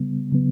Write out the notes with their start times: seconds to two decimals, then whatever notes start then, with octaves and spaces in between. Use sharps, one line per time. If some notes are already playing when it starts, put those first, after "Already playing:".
Already playing: C#3 G3 B3
0.32 C#3 F#3 B3